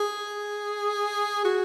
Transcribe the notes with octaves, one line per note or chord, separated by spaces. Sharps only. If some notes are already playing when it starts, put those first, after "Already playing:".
Already playing: G#4
F#4